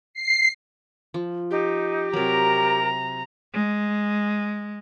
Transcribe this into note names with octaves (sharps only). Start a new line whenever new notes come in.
C7
F3
D#4 G4
C3 F#3 A#4 A#5
G#3